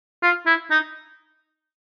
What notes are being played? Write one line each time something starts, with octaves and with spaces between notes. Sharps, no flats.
F4
E4
D#4